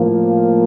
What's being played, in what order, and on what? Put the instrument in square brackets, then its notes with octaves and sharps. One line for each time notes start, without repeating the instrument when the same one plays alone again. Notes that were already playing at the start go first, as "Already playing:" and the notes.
Already playing: [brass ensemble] A2 F3 A#3